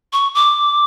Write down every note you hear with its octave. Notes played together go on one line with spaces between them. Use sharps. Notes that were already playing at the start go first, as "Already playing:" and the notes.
C#6
D6